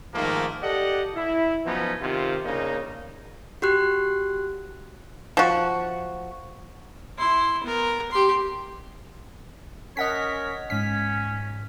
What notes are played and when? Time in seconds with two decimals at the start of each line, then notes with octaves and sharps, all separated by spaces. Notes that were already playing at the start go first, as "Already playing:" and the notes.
0.14 G#2 D#3 F3 A3 A#3
0.63 G4 A4 D5 D#5 F#5
1.15 E4
1.65 F3 F#3 B3 C#4 D#4
2.02 C3 D#3 F4
2.45 C#3 A#3 D4 D#4
3.62 F#4 G4 F#6
5.37 F3 F#4
7.18 E4 C6
7.64 B3 A#4
8.11 G4 C6
9.97 C#4 A#4 C#5 D#5 F#5 B6
10.70 G#2 C#4 B6